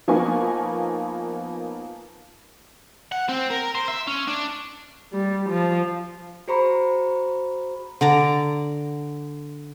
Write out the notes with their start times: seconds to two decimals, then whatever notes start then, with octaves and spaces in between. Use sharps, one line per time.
0.08 F3 A#3 B3 D#4 G#5 C#6
3.12 F#5
3.29 C4
3.51 A#4
3.75 C5
3.88 E5
4.07 C#4
4.27 D4
5.13 G3
5.50 F3
6.48 F#4 G#4 C5 A#5 B5 C#6
8.01 D3 D5 A#5